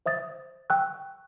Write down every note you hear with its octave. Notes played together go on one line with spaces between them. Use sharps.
C5 E5 D#6 A6
G5 C#6 E6 F#6